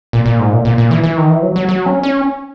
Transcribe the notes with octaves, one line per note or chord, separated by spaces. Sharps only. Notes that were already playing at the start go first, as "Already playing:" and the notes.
A#2
A#2
G#2
A#2
A#2
A#2
E3
E3
D#3
E3
F#3
F#3
F#3
C#4
C#4